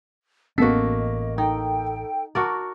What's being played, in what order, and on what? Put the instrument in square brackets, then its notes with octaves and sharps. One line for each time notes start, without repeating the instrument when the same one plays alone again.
[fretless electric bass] A1 B3 C#4 [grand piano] A#3 B6 [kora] F#4 A4 [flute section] D#5
[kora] D#4 [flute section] A4 G5
[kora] F#4 A#4 D5 [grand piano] A5 C#6